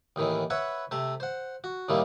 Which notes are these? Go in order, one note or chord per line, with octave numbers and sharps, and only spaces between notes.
D#2 A2 D#3 E3
B4 C#5 E5 F#5 B5
C3 A3 E5
C5 F#5
F#4
D#2 A2 D#3 G3 A3 A#3